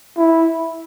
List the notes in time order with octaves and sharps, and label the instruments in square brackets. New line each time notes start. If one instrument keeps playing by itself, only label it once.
[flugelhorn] E4